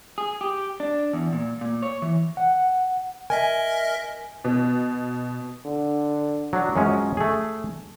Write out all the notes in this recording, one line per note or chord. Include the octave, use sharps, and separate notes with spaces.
G#4
G4
D4
E2
A#2
A#2
C#5
E3
F#5
A#4 D#5 E5 G#5
B2
D3
F#3 D4
F#2 F3 G#3 C#4
A3 G#4